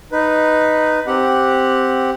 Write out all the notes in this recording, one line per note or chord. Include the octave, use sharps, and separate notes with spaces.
D#4 B4
C4 G4 F#5